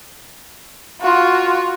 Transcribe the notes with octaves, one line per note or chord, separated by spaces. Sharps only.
F4 F#4